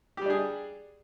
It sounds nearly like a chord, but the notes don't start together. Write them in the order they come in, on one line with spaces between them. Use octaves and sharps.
G4 G3 D4 G#4